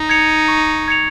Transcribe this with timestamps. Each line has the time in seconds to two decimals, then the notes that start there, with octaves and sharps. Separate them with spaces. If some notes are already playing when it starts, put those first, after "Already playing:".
Already playing: D#4
0.09 G#6 C#7 F7
0.48 C#6
0.88 G#6 C#7 F7